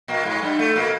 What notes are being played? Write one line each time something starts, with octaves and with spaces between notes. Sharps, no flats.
A#2 A#3
G#2 G#3
G2 G3
A2 A3
A#2 A#3